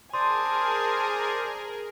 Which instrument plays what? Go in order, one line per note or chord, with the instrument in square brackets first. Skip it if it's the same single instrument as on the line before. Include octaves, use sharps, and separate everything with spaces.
[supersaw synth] G#4 A#4 [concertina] C5 D5 D#6 [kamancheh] G#5 A5 [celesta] C6